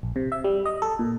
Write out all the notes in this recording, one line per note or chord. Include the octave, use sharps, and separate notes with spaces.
A#1
C3
E5
G3
D#5
A4
A#2